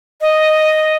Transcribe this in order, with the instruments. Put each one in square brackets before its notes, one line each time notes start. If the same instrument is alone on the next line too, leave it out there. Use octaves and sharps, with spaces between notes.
[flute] D#5